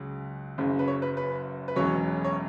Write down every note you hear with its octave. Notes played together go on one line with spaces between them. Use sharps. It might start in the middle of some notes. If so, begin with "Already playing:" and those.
Already playing: C#2 C#3 F#3
F#1 F#2 C#3
B4
C#5
B4
B4
B4
E1 E2 B2 F#3 C#4 C#5
C#5